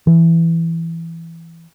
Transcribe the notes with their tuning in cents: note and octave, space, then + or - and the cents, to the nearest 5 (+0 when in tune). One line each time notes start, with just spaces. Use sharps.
E3 +10